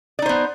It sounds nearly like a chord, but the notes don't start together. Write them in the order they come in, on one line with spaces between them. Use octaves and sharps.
D5 D#4 C5 B3